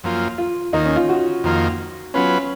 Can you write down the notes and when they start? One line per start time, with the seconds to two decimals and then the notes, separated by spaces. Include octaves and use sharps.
0.04 F#2 F3 A#3 F4
0.38 F4
0.73 D#2 D#3 A#3 D#4
0.85 C#4
0.96 F4
1.09 F#4
1.44 F2 D#3 A#3 F4
2.14 F#3 B3 C#4 F4 B4